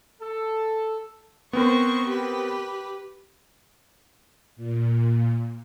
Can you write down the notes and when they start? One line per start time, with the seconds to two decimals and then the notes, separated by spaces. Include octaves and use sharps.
0.20 A4
1.53 B3 C4 A#4 C5 C#6
2.06 G4 B4
4.56 A#2